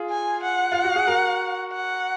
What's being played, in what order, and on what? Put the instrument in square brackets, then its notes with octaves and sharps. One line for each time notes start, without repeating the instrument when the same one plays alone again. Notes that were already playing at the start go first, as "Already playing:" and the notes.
Already playing: [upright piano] F4 G#4
[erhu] G#5
F#5
[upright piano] F4
F#4
G#4
F#4 A#4
[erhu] F#5